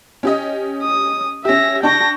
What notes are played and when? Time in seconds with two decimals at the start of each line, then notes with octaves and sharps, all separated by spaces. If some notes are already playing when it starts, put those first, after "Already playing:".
0.23 C#4 G4 D#5
0.82 D#6
1.45 C#4 G4 E5 A#6
1.83 D4 G5 A5 C#6 A#6